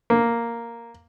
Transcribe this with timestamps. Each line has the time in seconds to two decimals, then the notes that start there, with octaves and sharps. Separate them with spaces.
0.10 A#3